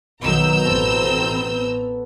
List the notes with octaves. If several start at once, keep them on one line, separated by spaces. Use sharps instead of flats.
B1 D#3 F#3 B3 A#5 E6 G6
A1 C4 F#4 A4 B4
B3